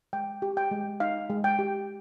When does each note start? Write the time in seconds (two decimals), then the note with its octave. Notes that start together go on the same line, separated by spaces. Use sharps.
0.13 G#3 G5
0.42 G4
0.57 G5
0.71 G#3
1.00 D#4 F5
1.30 G#3
1.44 G5
1.59 G4